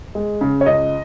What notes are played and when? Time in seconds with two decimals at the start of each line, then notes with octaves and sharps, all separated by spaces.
0.15 G#3
0.41 C#3
0.61 C#5
0.66 C#2 D#5